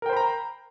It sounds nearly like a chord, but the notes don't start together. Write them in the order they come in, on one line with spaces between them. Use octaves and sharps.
A#4 G5 C5 B5 A#5